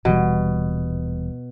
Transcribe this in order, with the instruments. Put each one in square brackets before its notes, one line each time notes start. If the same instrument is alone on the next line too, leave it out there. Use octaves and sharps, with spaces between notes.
[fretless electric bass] D#1 E3 G3 [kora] B2